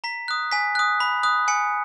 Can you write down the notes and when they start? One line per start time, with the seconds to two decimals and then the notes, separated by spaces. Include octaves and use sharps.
0.04 A#5 B6
0.28 D#6 F#6
0.52 G#5 B6
0.75 D#6 F#6
1.00 B5
1.23 D#6 F#6
1.48 G#5 C#7